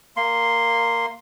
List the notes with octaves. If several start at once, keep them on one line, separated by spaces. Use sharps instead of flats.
A#3 C6